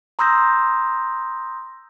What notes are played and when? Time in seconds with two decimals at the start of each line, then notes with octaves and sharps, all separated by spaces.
0.19 A#5 C6 D#6 E6 G6 A#6